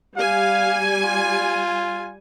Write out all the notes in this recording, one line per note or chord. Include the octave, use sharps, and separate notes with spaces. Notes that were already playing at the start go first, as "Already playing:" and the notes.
G3 F5 G#5
F4